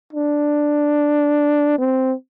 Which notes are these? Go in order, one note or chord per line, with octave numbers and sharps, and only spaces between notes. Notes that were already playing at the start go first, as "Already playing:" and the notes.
D4
C4